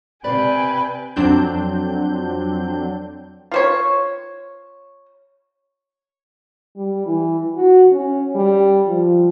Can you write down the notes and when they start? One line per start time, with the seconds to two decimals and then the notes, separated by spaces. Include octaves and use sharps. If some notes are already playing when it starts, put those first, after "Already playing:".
0.24 C3 B4 D5 F5 G5 G#5
1.16 F2 F#3 C4 D4 G6
3.52 F4 C5 C#5
6.76 G3
7.06 E3
7.56 F#4
7.92 C#4
8.35 G3
8.88 F3